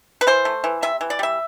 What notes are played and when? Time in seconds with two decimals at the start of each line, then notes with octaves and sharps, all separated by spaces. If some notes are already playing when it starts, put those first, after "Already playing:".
0.21 B4
0.27 E3 C5
0.45 A3
0.64 E3
0.82 C3 E5
1.01 E3
1.10 D5
1.19 G3 E5